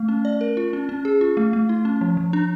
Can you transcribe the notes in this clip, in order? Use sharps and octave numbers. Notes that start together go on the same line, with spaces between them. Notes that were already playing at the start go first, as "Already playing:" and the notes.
Already playing: A3
C#4
D5
A#4
F4
C#4
C#4
G#4
F4
A3
A3
E4
C#4
F3
F3
D4